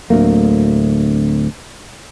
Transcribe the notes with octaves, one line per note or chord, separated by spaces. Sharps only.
D1 D2 A3 A#3